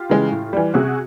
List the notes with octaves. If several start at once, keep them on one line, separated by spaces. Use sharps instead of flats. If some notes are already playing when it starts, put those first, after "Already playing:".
Already playing: F4 G4
C#3 E3 G#3
A2
E3 G3
C3 F#4 G#4